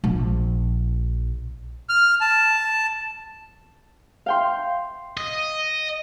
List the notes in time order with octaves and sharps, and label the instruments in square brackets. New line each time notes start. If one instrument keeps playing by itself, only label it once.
[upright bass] A#1
[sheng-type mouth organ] F6
A5
[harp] F5 G5 C6
[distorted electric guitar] D#5